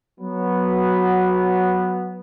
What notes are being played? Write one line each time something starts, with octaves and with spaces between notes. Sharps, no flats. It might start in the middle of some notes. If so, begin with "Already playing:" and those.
F#3 B3